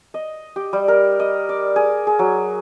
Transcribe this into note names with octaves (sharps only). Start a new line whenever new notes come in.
D#5
G4
G3
A#4
D#5
D5
G#4
G#4
F#3